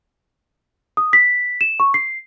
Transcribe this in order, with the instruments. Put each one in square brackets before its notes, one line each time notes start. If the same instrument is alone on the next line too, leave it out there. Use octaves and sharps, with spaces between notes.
[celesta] D#6
B6
E7
C#6
C7